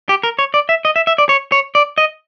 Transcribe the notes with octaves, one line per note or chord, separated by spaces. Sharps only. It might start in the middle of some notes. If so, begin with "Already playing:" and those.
G4
A#4
C#5
D5
E5
D#5
E5
E5
D5
C#5
C#5
D5
D#5